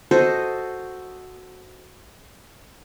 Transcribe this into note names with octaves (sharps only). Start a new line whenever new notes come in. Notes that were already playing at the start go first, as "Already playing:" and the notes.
F#4 A4 C5 D#5